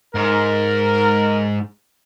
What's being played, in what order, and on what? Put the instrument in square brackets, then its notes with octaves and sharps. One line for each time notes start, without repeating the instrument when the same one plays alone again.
[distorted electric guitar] G#2 [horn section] A#4